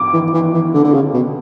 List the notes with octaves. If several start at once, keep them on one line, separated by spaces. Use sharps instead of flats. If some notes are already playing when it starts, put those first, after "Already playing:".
Already playing: D6
E3
E3
E3
D3
D3
C#3
B2